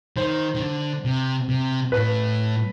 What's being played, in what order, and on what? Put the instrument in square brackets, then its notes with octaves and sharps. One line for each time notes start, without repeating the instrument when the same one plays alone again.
[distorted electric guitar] D#3 [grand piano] C5
[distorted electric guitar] D#3
D3
C3
C3
[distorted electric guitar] A2 [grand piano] B4